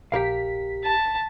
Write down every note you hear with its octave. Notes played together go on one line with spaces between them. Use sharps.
A#1 G4 A#4 F5 B6
A5